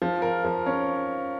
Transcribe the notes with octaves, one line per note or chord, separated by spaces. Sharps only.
F3
A#4
F3
C#4